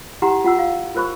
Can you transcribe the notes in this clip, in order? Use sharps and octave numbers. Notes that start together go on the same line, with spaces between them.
E4 G4 F#5 A#5 C6
F4 F#5 E6
F5
F4 A#4 C5 B5 C#6